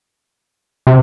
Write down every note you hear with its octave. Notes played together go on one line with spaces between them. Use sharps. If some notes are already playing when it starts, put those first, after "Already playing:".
C3